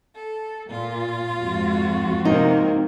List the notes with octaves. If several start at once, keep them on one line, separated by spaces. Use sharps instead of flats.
A4
A#2 F4
F2 G#2 F#4
C3 A#3 C4 D#4